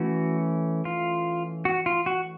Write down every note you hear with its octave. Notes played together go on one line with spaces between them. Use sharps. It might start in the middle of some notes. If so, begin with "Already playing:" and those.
Already playing: E3 A3 C#4 F#4
F4
F#4
F4
F#4